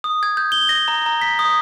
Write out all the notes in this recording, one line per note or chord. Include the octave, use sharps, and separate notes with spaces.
D#6
G#6
G6
G7
A#6
A#5
A#5
B6
D#6